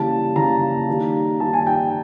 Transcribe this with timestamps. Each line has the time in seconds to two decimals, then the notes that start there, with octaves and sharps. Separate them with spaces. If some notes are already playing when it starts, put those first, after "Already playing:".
Already playing: C#3 E3 G3 A#3 A5
0.35 C#3 E3 G3 A#3 A#5
0.88 D#3 G3 A#3
1.40 D#3 G3 A#3 A5
1.53 G#5
1.67 G5